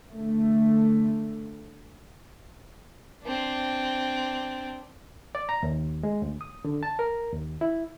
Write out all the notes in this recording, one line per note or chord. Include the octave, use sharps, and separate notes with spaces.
D3 A3
C4 D4
D5
A#5
D#2
G#3
D2
D#6
D3
A5
A#4
D#2
E4